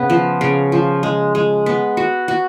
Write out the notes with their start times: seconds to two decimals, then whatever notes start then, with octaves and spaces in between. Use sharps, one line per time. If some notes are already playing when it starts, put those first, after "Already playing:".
Already playing: C#3 B3
0.10 F3
0.41 C#3
0.72 F3
1.03 G#3
1.35 G#3
1.66 B3
1.97 F#4
2.28 F#4